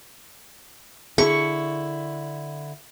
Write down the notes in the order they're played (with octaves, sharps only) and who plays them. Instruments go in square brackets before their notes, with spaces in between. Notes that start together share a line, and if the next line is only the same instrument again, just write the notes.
[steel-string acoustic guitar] D3 E4 [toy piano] G#4 [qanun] C#6